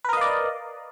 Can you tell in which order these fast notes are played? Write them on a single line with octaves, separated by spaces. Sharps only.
B4 A#4 D#5 F5 D5